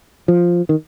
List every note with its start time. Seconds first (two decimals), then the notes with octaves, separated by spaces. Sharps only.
0.28 F3
0.69 D#3